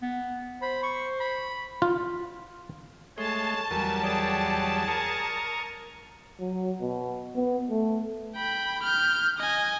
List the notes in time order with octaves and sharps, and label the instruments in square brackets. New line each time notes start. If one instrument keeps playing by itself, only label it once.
[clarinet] B3
[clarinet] C5 [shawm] B5
[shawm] C#6
B5
[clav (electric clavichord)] F4
[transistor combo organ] G#3 [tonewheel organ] A3 C6 [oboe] C#5 [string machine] A5
[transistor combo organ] E2 F#3 G3 [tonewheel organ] A#4 G#5
[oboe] G#4 [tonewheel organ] C#5 D5 G5
[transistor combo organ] A#4 [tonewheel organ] C#6 D#6
[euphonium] F#3
B2
B3
A3
[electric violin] G5 B5
F6 G6
D#5 G#5